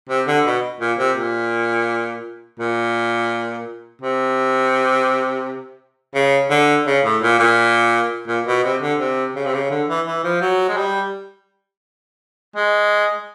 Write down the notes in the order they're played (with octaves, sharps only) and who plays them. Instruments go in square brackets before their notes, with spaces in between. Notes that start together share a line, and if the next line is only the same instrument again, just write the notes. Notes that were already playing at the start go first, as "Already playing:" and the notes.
[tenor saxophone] C3
D3
B2
A#2
C3
A#2
A#2
C3
C#3
D3
C#3
A2
A#2
A#2
A#2
B2
C3
D3
C3
C#3
C3
C#3
D3
E3
E3
F3
F#3
G#3
G3
G#3